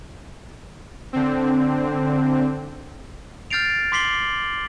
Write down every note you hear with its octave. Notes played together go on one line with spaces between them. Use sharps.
D3 C4
F6 G6 A6 C7 D7 F7
C6 D6 B6 C7 F#7 G7